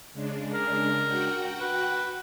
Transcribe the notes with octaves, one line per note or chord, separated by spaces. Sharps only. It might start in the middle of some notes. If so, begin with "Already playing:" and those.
C#3 G#3 D4
A#4
F#4 F#5 G5
B4